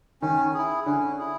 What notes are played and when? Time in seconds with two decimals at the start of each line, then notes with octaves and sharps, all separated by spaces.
0.22 D#3 C#4
0.54 E4 G#4
0.86 D3 C#4
1.19 E4 G#4